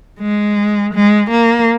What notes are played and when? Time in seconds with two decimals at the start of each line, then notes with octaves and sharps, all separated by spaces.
0.20 G#3
0.95 G#3
1.31 A#3